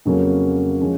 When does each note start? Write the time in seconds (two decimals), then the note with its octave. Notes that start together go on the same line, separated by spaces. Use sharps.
0.05 F2 C#3 F#3 A#3 C#4
0.81 F3 G#3 C#4